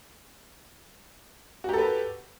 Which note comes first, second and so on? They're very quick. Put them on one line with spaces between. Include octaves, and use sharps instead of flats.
F#4 G4 A4 B4